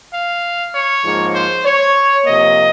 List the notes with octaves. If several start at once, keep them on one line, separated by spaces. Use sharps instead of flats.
F5
C#5
G#2 F3 A#3
C5
C#5
C3 F3 A#3 D#5